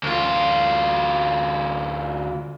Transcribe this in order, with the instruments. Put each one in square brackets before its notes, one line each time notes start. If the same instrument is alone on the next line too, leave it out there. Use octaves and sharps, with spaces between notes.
[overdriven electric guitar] D2 F4